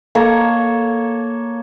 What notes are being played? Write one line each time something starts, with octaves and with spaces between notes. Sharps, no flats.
A#3 A4 C#5 A#5